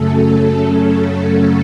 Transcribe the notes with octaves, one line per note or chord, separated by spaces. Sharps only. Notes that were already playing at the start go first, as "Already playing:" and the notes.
Already playing: F#2 C#3 F#3 A3 C#4 A4